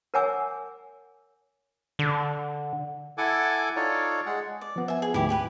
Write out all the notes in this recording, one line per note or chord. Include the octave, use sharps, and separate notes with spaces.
A#4 C#5 F#5 G#5 D6 E6
D3
E4 A4 F#5 G#5 D6
D#4 F4 A4 C#5 D5
G#3 G#4 F#5
D5
F3 B3
E5 G#5
G#4
D2 G#2 E4 G4
E4 G4 B4